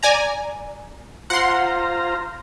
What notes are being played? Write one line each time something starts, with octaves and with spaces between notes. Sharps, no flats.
D5 G#5 A#5
F4 C5 F#5 A#5 C6